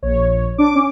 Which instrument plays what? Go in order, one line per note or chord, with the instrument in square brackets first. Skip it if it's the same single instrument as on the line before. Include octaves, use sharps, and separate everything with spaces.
[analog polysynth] A#1 C#5
[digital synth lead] D4 [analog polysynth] D6
[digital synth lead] C#4